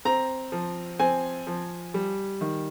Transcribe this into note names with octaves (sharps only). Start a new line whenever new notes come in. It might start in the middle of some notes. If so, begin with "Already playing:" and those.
C4 A#5
F3
C4 G#5
F3
G3
D#3